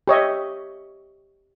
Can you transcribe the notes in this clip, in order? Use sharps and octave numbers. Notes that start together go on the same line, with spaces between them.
G4 C#5 D#5 E5